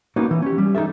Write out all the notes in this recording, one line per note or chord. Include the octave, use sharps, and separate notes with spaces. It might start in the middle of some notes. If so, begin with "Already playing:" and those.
A#3 B3 C#4 D#4 F#4
E3
C#4 G4
G3
D#4 E4 G#4 A4 E5